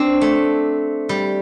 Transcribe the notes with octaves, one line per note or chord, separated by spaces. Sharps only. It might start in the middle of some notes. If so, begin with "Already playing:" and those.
Already playing: C4 D4
A3
G3